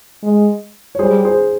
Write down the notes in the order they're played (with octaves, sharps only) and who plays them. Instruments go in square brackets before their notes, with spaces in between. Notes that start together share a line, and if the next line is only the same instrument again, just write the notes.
[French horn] G#3
[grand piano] C#5
[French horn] G3 [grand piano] G#4 C5
[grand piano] G#4 C5